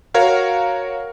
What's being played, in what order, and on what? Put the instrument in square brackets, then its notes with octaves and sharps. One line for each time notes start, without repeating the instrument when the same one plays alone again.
[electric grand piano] F#4 A#4 C#5 F5